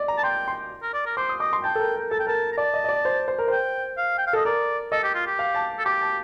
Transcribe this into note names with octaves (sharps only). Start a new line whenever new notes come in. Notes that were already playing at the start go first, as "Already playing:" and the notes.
Already playing: D5 D#5
A#5
A5
G5 C6
C6
A#4
D5
A#4
C5 D6
D#6
D#5 D6
C6
G5 A5
A4
A#4
A#4
A4 A5
G5
A#4 A5
A#5
D5 A5
D#5
D#5
D5
C5
C5
A#4
C5 G5
F5
G5
F5
A4 D#5
A#4 D5
A4 D#5
G4
F4
G4
F5
A5
A4
G4 D6
A5